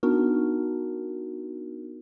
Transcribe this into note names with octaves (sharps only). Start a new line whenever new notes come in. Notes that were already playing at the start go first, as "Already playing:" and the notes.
B3 D4 D#4 F#4 A#4